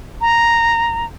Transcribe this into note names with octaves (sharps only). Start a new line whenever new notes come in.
A#5